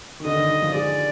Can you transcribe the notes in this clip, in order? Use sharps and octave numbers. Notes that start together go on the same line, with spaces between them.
D#3
D3 D#5
D#3
D#3
F3
G#3 D5